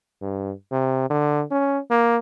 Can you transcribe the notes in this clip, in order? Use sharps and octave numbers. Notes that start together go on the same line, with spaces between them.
G2
C3
D3
C#4
A#3